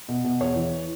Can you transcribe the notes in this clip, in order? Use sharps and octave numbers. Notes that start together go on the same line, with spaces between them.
B2
B2
E2 C#5
E3